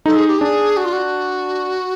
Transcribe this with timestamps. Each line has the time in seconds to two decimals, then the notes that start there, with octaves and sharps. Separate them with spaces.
0.06 D#4 A4
0.16 G#4
0.28 G4
0.39 D4 G#4
0.77 F#4
0.85 F4
0.93 F#4